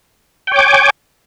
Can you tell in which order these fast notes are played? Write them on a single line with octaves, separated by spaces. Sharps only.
G5 C#5 D6 G#5